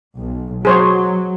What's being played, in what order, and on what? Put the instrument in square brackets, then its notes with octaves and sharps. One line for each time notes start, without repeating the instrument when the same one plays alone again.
[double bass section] B1
[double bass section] F#3 [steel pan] G#4 C5 C#5